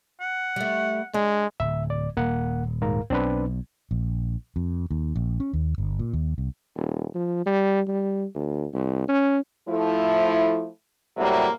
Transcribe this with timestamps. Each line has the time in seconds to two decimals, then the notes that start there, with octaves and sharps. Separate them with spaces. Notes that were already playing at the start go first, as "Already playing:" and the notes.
0.20 F#5
0.56 G3 A3
1.14 G#3 D4
1.60 D1 E5
1.90 D5
2.17 D#1 A#3 F#5
2.82 G#2 A#4 F5
3.10 B1 C4 D4 B4
3.91 A#1
4.56 F2
4.91 D#2
5.16 A#1
5.40 C#4
5.53 D#2
5.78 G1
5.99 A#2
6.13 D#2
6.38 C2
6.76 D#1
7.15 F3
7.46 G3
7.88 G3
8.35 D2
8.74 C2
9.08 C#4
9.68 F3 A3 E4
11.17 A2 C3 F#3 G3 A3 A#3